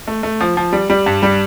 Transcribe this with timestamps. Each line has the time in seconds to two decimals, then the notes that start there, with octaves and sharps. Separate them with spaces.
0.07 A3
0.23 A3
0.41 F3
0.57 F3
0.73 G3
0.90 G3
1.06 G2
1.23 G3